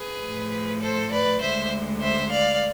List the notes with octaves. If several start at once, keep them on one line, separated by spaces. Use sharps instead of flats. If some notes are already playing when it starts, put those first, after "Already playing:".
Already playing: G#4 B4
A2 F3 A3
A4 C5
B4 D5
D2 D3 G#3 C5 E5
C5 E5
D5 F5